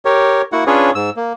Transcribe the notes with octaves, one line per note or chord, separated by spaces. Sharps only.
G4 A#4 C#5
A#3 E4 F#4 F#5
C#4 D4 F4 G#4 B4 C#5
G#2 E6
A#3